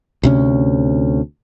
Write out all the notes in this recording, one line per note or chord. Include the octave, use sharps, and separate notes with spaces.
D2 C3 C#4